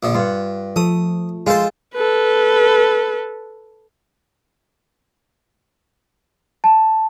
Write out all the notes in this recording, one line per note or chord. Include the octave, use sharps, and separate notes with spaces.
A#1 D3
G2 F4 F#5
F3 A3 D#6
G#3 F4 A4 C5 A5
A4 B4
A5